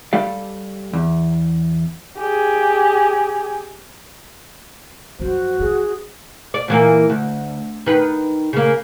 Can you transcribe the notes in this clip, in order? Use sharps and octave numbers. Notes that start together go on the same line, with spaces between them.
G3 G4 A4 F5
E2
G4 G#4
F#2 F3 F#4 C5
E3 F3 G#4
D5
A#2 E3 A#3
D2
D#3 B4
C#3 A#3